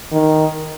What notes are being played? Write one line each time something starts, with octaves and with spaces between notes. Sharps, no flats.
D#3